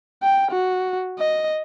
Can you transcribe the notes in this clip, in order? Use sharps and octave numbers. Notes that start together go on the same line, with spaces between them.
G5
F#4
D#5